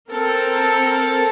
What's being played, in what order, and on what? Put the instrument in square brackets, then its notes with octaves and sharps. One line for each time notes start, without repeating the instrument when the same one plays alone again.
[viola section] C4 A4 A#4